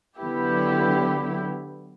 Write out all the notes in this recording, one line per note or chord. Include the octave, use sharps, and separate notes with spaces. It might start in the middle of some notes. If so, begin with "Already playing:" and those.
D3 F#3 B3 E4 G4